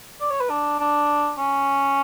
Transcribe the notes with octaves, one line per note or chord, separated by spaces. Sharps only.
D5
C#5
B4
D4
D4
C#4